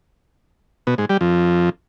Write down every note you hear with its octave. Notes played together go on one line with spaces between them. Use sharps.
B2
G#2
G3
F2